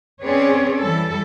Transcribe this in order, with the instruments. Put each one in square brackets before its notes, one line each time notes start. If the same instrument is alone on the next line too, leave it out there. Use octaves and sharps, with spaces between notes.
[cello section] C4 C#4 G#4 B4 C#5 D5
E3 G3 A4